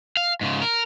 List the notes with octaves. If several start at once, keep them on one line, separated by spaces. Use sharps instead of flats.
F5
G#2 C#3
A#4